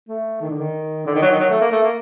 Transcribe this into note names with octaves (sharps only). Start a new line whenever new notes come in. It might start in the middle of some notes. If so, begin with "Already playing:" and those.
A3
D#3
D3
D#3
D3
D#3
F#3
D#3
F#3
A3
A#3
A3
A#3